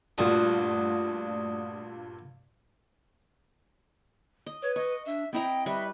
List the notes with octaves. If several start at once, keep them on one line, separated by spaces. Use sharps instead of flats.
G2 A#2 A3 F4 F#4 D5 D#6
D#5
B4 C#5
D#5 C#6
D4 E5
C4 E4 D#5 G5 A#5
G3 B4 E5 C#6